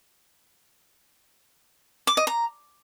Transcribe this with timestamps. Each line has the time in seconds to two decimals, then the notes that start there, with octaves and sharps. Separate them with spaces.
2.07 D6
2.17 D#5
2.27 A#5